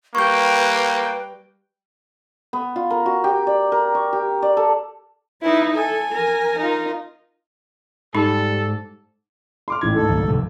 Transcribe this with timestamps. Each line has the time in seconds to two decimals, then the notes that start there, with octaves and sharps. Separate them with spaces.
0.15 G3 A#3 B4 G5 C#6 G6
2.53 B3
2.76 F4
2.90 A#4
3.06 F#4
3.24 G4
3.47 D5
3.72 A#4
3.95 C#6
4.13 G4
4.42 D5
4.57 A4
5.42 D#4 E4 B4
5.75 A4 G#5
6.13 A#4
6.58 D#4 F4
8.15 G#2 G3 D#4 A4
9.68 C6 D6 F6
9.81 A1 E3 G#6
9.94 D2 G#2 A4
10.09 C#2 D#3 F#3
10.28 C3 F3 G3